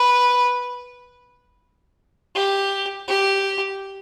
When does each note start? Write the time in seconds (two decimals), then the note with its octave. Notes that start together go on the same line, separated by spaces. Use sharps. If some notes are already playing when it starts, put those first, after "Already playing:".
Already playing: B4
2.35 G4
3.08 G4